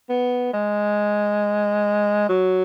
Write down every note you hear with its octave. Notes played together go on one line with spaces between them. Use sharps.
B3
G#3
F#3